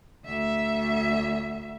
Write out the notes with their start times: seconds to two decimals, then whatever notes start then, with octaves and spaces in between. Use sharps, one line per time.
0.25 D2 E5